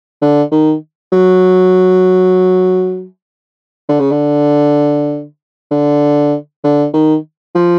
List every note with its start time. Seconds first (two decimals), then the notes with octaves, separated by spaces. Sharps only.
0.22 D3
0.52 D#3
1.12 F#3
3.89 D3
4.00 C#3
4.11 D3
5.71 D3
6.64 D3
6.94 D#3
7.55 F3